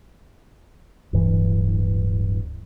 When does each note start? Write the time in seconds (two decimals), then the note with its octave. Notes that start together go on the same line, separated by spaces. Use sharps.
1.13 D1 G2 E3